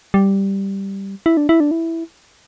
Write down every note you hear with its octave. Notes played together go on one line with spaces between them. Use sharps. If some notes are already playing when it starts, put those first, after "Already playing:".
G3
E4
D4
E4
D4
E4